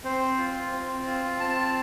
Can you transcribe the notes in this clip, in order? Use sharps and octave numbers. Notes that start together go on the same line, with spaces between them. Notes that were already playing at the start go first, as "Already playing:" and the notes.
C4 C5
F4
C4
F4
C4 A5